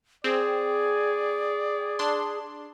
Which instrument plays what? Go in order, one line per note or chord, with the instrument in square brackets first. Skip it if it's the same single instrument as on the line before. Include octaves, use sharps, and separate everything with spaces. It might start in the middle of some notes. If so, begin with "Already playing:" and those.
[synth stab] C4 [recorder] G#4 [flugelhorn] D5
[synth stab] D4 C6